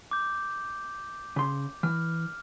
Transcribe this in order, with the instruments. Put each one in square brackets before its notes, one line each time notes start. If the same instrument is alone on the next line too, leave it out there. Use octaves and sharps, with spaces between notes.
[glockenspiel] D6 G6
[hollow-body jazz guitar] C#3 C6
[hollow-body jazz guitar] E3 [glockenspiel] F6